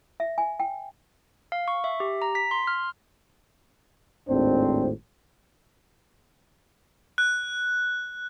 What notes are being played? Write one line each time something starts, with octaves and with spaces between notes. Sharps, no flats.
E5
G#5
G5
F5
C#6
E5
G4
A#5
B6
C6
F6
G#1 D#2 A2 C4 D4 C5
F#6